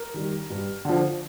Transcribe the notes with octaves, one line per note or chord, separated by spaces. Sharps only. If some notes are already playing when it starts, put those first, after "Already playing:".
Already playing: A#4
D#3 G3
G2
D3 F3